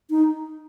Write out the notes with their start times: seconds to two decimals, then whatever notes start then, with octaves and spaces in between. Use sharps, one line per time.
0.10 D#4